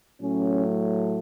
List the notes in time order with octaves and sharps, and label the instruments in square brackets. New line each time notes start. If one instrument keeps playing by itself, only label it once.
[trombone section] A2 F#3 A3 C#4